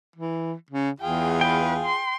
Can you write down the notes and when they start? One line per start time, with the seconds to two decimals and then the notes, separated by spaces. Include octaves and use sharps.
0.16 E3
0.71 C#3
1.00 E2 F4 G#4 G5
1.41 B4 G5
1.85 C6